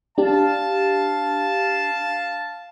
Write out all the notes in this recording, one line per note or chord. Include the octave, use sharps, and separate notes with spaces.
D4 G4 F5 A5